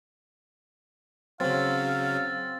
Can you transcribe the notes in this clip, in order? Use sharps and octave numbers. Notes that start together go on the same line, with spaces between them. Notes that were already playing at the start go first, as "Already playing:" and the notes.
C#3 F#3 C4 F5 E6 A6